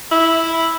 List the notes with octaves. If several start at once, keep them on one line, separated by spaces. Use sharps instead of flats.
E4